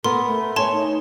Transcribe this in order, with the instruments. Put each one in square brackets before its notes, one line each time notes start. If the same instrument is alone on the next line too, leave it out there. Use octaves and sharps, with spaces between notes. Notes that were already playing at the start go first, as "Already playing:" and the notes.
[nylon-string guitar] B3 A#4 [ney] A4 [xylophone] C6
[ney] A3
[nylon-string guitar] C#5 G#5 [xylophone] A5 C6
[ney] D#4